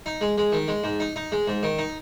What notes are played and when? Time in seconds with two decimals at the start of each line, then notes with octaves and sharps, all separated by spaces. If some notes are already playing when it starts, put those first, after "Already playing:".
0.06 D#4
0.21 G#3
0.38 G#3
0.52 D#3
0.68 G#3
0.84 G#2
1.00 D#4
1.16 D#4
1.32 G#3
1.48 G#2
1.63 D#3
1.78 D#4